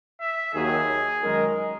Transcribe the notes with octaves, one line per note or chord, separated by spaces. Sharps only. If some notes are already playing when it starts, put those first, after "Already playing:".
E5
D#2 D#3 F#3 G#4
F#2 D#3 G#3 D#4 A#4